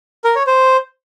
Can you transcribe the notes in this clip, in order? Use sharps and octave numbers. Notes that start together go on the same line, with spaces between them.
A#4
C#5
C5